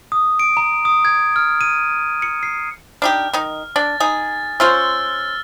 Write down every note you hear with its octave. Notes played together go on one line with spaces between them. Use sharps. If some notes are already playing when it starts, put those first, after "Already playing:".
D#6
D7
A#5
D#6
G#6
F6
D#7
C#7
C7
D4 D#4 G4 F6
D#3 D#4
D4 A6
D#4 G#4
C#4 F4 C5 E6 F6 A6